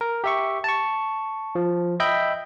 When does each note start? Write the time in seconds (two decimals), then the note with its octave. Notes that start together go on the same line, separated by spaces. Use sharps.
0.01 A#4
0.24 G4 E5 C#6
0.64 A5 C#6
1.55 F3
2.00 D#5 E5 G5 B5 G6